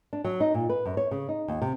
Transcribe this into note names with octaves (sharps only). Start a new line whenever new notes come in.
D4
F#3
D#4
A#2
B4
F#2
C#5
C#3
D#4
D#2
C3